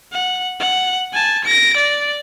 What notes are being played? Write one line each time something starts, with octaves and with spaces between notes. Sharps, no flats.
F#5
F#5
G#5 A5
A#6 D7
D5